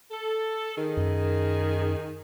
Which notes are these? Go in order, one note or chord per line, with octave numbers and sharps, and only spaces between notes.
A4
D#3 G#4
F#2